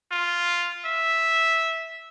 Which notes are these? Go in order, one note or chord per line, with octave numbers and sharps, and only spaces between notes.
F4
E5